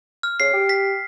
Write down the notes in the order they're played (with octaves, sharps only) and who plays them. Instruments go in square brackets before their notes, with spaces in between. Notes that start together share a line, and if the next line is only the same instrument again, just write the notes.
[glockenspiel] F6
[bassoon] C#3 [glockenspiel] C7
[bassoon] G4
[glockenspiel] B6